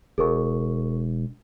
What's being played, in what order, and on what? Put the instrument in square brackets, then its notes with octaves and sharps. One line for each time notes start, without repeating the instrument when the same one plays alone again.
[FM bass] E1 [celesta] G#4 A#4 C#6